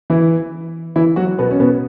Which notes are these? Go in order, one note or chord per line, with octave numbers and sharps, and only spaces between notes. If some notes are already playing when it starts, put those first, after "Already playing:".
E3 E4
E3 E4
F#3 F#4
B2 B3
C#4
B2 B3